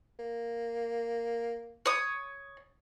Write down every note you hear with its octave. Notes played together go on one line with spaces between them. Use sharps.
A#3
C#5 D#6